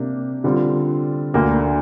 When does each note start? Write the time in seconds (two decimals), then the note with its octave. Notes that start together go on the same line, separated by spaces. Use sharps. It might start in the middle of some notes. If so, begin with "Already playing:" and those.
Already playing: C3 A#3 D4 G4
0.44 D3 G3 C4 F4
1.34 D2 D3 A#3